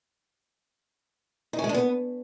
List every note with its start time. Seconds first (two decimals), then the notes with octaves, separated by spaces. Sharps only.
1.53 D#4
1.59 C#4
1.64 G#3
1.69 D4
1.74 B3